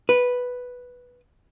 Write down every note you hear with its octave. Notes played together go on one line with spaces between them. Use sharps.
B4